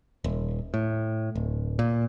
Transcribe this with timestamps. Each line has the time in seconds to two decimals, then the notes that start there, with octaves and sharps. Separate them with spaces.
0.24 D#1
0.74 A2
1.35 D1
1.79 A#2